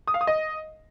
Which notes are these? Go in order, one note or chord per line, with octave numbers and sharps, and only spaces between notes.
D#6
F5
D#6
D#5